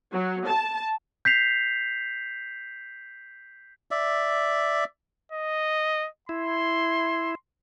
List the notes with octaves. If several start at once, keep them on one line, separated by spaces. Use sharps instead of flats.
F#3
A5
G6 B6 C7 F7
D5 E5
D#5
E4 C6